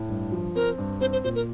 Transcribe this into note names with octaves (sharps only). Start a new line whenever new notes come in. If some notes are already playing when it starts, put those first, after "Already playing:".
Already playing: A2
G2
F3
C4 A#4
G2
C4 C5
C5
A#2 C5
A#4